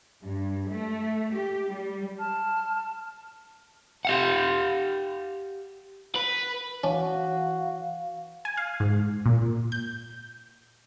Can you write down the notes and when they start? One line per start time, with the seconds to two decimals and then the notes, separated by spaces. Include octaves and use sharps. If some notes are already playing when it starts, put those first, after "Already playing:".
0.22 G2
0.68 A3
1.33 G4
1.73 G3
2.19 A5 F6
4.05 G4 F5 F#5
6.15 B4
6.84 E3 C#4 D4 F#4 F5
8.45 G#5
8.57 F5
8.80 G#2
9.26 A#2
9.72 G6